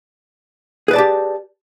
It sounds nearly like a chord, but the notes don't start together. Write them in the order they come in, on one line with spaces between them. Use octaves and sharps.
G#4 B4 D5 A5 G4